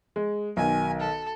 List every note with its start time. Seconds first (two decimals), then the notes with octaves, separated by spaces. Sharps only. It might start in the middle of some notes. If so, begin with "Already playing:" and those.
0.16 G#3
0.57 B1 D#3 G#5
1.00 A4